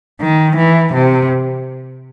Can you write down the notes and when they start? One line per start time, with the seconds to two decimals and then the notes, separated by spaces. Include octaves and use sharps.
0.21 D#3
0.56 E3
0.93 C3